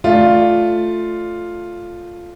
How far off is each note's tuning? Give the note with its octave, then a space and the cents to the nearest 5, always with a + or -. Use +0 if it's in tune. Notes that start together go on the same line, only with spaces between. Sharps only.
A3 +0 F4 +0 D5 +5